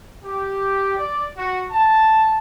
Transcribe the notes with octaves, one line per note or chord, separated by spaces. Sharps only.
G4
D5
F#4
A5